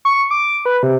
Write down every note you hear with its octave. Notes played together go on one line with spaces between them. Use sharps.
C#6
D6
B4
C3